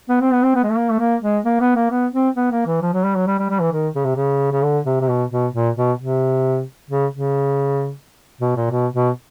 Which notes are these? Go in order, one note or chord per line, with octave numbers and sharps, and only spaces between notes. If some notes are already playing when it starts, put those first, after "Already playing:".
B3
C4
B3
C4
B3
G#3
A3
A#3
A3
A#3
G#3
A#3
B3
A#3
B3
C4
B3
A#3
E3
F3
F#3
G3
F#3
G3
G3
G3
E3
D#3
C#3
C3
C#3
C#3
D3
C3
C3
B2
B2
A#2
B2
C3
C#3
C#3
B2
A#2
B2
B2